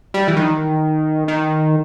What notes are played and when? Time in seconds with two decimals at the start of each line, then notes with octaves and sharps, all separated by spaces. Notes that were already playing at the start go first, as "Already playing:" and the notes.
0.14 G3
0.28 E3
0.37 D#3
1.28 D#3